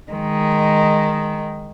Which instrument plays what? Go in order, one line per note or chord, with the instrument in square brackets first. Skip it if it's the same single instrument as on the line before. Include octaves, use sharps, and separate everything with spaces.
[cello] D#3 G#3